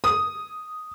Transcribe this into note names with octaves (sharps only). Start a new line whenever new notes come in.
D#6